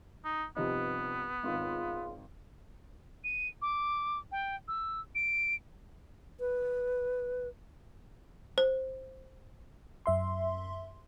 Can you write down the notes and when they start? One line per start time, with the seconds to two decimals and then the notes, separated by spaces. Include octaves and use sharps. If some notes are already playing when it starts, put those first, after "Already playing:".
0.25 D#4
0.56 G2 C3 F3 B3 D#4
1.43 G#1 C#2 D#3 F4
3.24 D#7
3.62 D6
4.32 G5
4.68 E6
5.15 D7
6.40 B4
8.58 C5
10.06 F#2 E5 C6